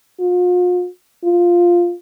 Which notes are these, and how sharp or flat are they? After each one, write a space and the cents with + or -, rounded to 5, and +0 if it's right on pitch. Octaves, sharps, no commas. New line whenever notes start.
F4 +45
F4 +0